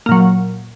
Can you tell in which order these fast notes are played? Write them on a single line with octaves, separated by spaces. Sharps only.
A#3 A#2 F#3